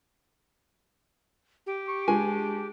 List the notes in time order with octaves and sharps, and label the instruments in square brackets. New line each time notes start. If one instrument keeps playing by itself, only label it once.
[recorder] G4
[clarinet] C#6
[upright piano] G#3 [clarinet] D4 [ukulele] G#5